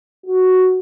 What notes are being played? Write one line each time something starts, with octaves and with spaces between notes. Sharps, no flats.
F#4